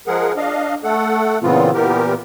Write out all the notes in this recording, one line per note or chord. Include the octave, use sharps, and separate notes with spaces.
F3 G#3 G#4 A#4 F#5
D4 D#5 F5
A3 A4 F#5
A#2 C#3 E3 B3 C4 F4
A#2 E3 B3 G4 A#4